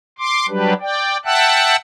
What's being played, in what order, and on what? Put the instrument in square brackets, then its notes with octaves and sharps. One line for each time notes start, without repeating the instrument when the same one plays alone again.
[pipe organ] C6 D6
F#3 G3 D4 G4 B4
D5 G5
E5 F#5 G5 A5 E6 F#6